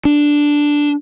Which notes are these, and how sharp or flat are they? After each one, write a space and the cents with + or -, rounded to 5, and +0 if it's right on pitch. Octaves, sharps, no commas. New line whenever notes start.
D4 -5